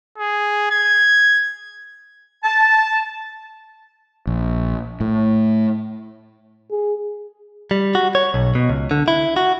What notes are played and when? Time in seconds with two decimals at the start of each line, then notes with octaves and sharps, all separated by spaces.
0.18 G#4
0.71 G#6
2.44 A5
4.27 A#1
5.00 A2
6.71 G#4
7.71 G3
7.95 F#4
8.15 C#5
8.34 B1
8.55 B2
8.69 C#2
8.91 D3
9.08 E4
9.36 F#4